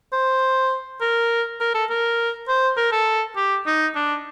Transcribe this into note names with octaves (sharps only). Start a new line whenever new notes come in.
C5
A#4
A#4
A4
A#4
C5
A#4
A4
G4
D#4
D4